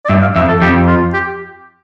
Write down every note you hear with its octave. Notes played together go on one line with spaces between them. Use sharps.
D5
G2 E5
F5
F2 E5
A4
F2 G4
F4
G4